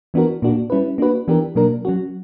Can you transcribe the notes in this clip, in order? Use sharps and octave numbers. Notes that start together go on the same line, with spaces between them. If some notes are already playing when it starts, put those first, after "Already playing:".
E3 B3 D4 F#4 A#4
A#2 A#3 D4 F#4
G3 C#4 E4 B4
A#3 D4 F#4 B4
E3 B3 D4 G4 A#4
B2 F#3 A#3 D4 A#4
F#3 C#4 F#4